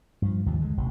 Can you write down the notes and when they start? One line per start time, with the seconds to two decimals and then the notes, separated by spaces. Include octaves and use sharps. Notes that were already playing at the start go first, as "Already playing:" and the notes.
0.22 G2 F3
0.46 D#2 G#2 C3 F3
0.61 D3 D#3 G#3
0.77 E1 A1 C3